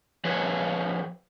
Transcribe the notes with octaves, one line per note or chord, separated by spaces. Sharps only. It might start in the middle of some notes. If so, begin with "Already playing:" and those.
F3 G#4 B4 C#5